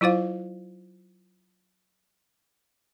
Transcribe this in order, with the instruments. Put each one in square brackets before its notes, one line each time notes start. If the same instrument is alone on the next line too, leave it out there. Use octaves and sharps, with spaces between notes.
[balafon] F#3 E4 F4 C5 F5